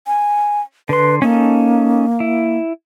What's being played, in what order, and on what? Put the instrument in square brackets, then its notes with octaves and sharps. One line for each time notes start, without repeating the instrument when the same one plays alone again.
[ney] G#5
[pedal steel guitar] D3 C6 [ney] B4
[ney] A#3 [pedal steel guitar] C#4 D#4 A4
[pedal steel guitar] E4